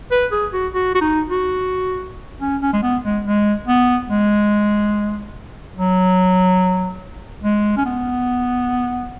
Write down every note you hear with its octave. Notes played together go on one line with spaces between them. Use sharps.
B4
G#4
F#4
F#4
F#4
D#4
F#4
C#4
C#4
G#3
B3
G#3
G#3
B3
G#3
F#3
G#3
C#4
B3